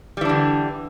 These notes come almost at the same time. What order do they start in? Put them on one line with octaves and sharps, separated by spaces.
G3 E3 D4 D3